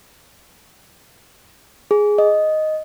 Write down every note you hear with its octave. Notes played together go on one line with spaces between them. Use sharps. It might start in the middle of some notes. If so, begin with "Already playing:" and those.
G#4
D#5